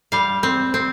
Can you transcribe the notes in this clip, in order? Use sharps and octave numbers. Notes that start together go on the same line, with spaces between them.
G3 F5
C4
C4